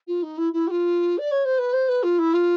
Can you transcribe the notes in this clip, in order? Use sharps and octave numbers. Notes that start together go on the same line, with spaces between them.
F4
D#4
E4
E4
G4
F4
D5
C#5
C5
B4
C5
B4
F4
E4
F4